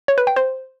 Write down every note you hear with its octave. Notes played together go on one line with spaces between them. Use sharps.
C#5
B4
G5
C5